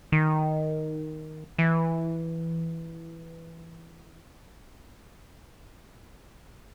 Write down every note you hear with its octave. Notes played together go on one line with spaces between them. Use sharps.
D#3
E3